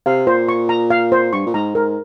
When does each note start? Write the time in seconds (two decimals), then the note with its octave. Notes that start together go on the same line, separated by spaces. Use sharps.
0.06 C3 F5
0.27 A#2 C5
0.49 C#6
0.69 A#5
0.90 F5
1.12 C5
1.33 G2 C#6
1.46 A#2
1.54 G#2 A#5
1.75 G#2 A#4